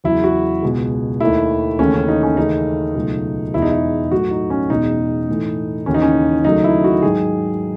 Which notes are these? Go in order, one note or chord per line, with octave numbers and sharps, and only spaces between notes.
E2 C#3 F#3 E4
F#4
C#2 B2 G#3
D#2 D#3 A3 E4
D#2 C#3 E3 A3 C#4
C#4
D#4
C#4
D#2 C#3 E3 A3 D#4
C#2 B2 F#3 A3
E2 B2 G#3 E4
D#4
E4
A2 F#3 A3 F#4
D#4
C#4
E2 B2 G#3 D#4
A2 E3 A3
D#2 C#3 E3 C#4
D#4
C#4
D#2 C#3 F#3 A3 D#4
E4
F#4
G#2 D#3 F#3 G#4